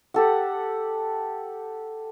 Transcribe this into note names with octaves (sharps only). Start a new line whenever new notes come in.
G4 A4 F#5